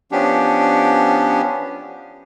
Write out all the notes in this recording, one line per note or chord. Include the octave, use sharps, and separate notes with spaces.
F3 B3 C#4 D4 G4